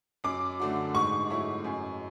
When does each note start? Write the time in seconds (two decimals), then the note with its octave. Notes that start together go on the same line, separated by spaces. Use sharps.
0.24 F#2 D6
0.60 D3 A3 D4 F#4
0.95 G#2 C#6
1.30 F#3 A3 E4 G#4
1.64 F#2